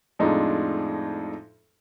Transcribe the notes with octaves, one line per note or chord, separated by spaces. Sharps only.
F2 A2 G#3 D4 D#4 F4